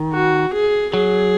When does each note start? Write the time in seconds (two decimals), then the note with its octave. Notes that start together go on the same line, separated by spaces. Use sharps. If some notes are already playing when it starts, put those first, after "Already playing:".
Already playing: D#3
0.12 F#4
0.53 G#4
0.94 F#3 G#4